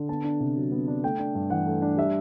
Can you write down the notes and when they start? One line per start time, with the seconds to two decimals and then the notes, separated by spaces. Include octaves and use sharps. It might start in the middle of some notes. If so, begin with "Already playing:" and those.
Already playing: D3
0.09 B3 A5
0.24 D4
0.40 C3
0.56 F#3
0.72 B3
0.88 D4
1.03 A3 G5
1.19 D4
1.35 G2
1.50 E3 F#5
1.66 A3
1.82 D4
1.97 G3 E5